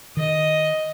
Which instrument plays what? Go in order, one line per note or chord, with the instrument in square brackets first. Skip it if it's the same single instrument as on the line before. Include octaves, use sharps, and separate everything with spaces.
[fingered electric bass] D#3 [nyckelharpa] D#5